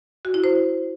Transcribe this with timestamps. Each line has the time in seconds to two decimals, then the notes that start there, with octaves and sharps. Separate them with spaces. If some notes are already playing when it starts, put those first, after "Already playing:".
0.25 F#4
0.34 E4
0.44 C5